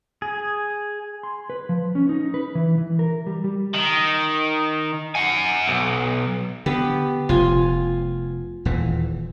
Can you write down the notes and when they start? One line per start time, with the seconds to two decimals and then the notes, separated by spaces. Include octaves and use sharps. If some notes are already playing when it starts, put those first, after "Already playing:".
0.22 G#4
1.23 C6
1.50 B4
1.69 F3
1.95 C#4
2.09 D#4
2.34 B4
2.55 E3
2.78 E3
2.99 A#4
3.27 G3
3.44 G3
3.74 D#3
5.15 F#5 G#5
5.68 B1
6.66 D3 B3 G4
7.29 F1 F4 G#5
8.65 D#1 A#2 E3